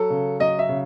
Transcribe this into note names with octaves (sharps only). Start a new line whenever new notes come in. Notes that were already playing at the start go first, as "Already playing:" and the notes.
Already playing: F#3 A4
C#3
F#3 D#5
E5
C#3